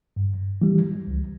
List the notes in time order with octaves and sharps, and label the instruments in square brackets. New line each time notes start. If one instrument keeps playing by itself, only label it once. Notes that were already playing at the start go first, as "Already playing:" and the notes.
[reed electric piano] G2
E3 G3
C#2